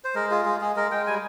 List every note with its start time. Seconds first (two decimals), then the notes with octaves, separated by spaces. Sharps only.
0.04 C5
0.15 G#3 A#4
0.31 F4 G#4
0.45 G#3 G#4
0.61 G#3 G#4
0.76 G#3 A#4
0.91 G#3 G5
1.07 G3 G#5